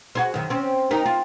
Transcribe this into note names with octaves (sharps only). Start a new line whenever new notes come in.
F#4 G#4 C5
F#2 D#3
C4 C#4
D#4 G4 A#4
F4